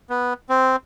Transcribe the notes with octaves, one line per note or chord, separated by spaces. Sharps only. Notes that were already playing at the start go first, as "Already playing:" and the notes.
B3
C4